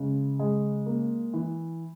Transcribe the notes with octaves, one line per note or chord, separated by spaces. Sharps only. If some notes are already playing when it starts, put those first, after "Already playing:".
Already playing: C#3 G#3
G#3
A#3
E3